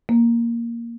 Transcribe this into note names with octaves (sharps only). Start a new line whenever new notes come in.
A#3